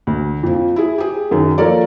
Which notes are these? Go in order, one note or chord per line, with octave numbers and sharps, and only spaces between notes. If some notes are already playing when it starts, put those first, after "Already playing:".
D2
F2 F3
E4 G#4
G4 G#4
F#2 D#3
F3 A#3 A4 A#4 C#5 D5